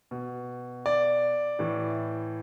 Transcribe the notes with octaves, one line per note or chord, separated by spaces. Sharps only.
B2
D5
A2 E3